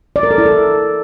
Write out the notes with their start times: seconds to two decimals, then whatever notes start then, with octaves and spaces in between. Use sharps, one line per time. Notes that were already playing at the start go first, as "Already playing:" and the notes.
0.16 D5
0.23 A#4
0.31 A4
0.38 E4
0.46 A4